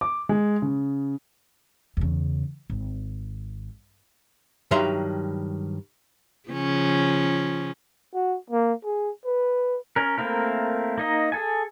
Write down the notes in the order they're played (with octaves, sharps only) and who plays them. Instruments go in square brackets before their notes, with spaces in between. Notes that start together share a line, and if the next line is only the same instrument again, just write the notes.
[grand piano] D6
G#3
C#3
[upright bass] E2 C#3
G#1
[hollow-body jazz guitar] G2 D#3 F#3 E5 A#5 C6
[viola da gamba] C#3 F3 C#4
[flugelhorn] F#4
A#3
G#4
B4
[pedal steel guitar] C#4 A#4
A3 A#3 C4 E4 A#4
A#3 D#4 D#5
G#4 A4 G#5